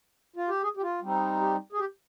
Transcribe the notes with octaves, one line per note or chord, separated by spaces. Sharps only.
F4
G4
G#4
G4
F4
G3 C4 D#4
G4
G#4
G4